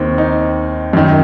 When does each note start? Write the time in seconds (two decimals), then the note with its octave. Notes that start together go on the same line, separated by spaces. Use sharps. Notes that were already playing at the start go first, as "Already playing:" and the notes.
Already playing: D#2 D#3 C4
0.18 D#4
0.93 F#2 D#3